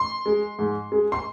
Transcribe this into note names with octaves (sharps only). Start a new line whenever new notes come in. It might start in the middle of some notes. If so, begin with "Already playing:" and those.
Already playing: C6
G#3
G#2
G#3
C6